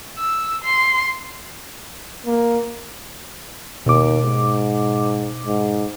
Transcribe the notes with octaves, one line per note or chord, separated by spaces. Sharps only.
E6
C6
A#3
D#2 B2 D6
G#2
G#2